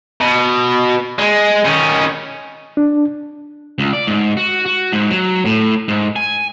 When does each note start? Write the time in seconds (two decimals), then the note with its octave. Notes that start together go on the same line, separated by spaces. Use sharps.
0.21 B2
1.19 G#3
1.65 D#3 C#4
2.77 D4
3.78 C#2
3.93 D5
4.07 G#2
4.37 F#4
4.66 F#4
4.93 G#2
5.11 F#3
5.45 A2
5.88 G#2
6.16 G#5